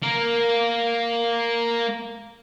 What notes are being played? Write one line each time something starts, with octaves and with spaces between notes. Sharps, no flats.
A#3 A#4